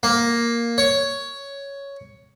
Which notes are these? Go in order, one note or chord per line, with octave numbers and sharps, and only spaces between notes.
A#3
C#5